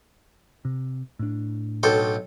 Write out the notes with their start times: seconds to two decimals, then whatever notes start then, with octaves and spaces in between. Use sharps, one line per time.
0.65 C3
1.19 A2 D4
1.83 B1 A4 G5